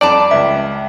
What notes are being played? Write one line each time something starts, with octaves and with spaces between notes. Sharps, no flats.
F2 G3 D5 A5 A#5
C#2 E5